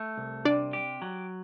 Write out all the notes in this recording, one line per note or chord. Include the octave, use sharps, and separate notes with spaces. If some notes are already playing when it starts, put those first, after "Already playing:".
Already playing: A3
C2
C3 D4 D5
G4
F#3